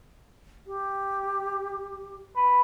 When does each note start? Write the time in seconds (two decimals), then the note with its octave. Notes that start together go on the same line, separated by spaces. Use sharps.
0.67 G4
2.36 B4